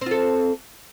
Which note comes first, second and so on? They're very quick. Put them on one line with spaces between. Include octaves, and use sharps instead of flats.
C4 F4 A4